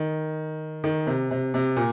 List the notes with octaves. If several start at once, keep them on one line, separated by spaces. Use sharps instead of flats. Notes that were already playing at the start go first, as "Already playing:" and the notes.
Already playing: D#3
D#3
C3
C3
C3
A#2